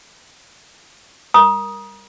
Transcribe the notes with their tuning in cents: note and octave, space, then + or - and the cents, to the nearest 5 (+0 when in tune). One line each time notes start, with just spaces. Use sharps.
A#4 +0 A#5 +40 D#6 +0